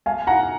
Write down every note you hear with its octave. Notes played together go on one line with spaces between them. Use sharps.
F5 G#5
F#5 A#5